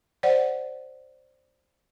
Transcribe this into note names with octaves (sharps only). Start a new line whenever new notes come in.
C5 D5 F#5